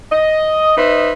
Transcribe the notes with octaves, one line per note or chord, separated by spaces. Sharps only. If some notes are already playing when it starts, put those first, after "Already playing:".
D#5
D#4 B4 C5 D#5 E5